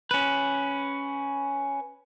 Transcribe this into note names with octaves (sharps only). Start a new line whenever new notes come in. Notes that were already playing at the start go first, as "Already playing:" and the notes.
C#4 B4